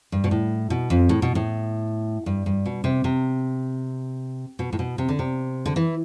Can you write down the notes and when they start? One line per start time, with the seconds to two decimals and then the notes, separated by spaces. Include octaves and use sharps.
0.12 G2
0.24 B2
0.31 A2
0.70 B2
0.90 F2
1.09 A2
1.22 B2
1.35 A2
2.26 G2
2.46 G2
2.66 B2
2.84 C3
3.04 C3
4.59 B2
4.73 A2
4.79 B2
4.98 C3
5.09 D3
5.19 C3
5.66 D3
5.76 E3